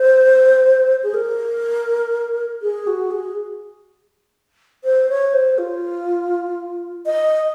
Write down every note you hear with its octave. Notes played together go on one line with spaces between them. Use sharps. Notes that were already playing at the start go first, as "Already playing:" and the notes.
Already playing: C5
G#4
A#4
G#4
F#4
G#4
C5
C#5
C5
F4
D#5